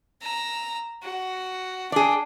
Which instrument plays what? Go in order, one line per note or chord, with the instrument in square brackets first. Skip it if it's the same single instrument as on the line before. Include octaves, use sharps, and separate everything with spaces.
[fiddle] A#5 E6
F#4
[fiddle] D4 G5 [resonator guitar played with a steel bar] G#4 D5